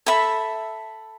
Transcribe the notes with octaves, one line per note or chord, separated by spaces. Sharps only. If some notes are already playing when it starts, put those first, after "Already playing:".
A4 E5 B5